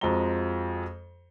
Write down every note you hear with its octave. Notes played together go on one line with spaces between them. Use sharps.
F2 F3 G#3 F#4 A#5 G7